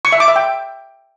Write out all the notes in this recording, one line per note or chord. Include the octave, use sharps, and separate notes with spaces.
C#6
E5
D6
E5
G5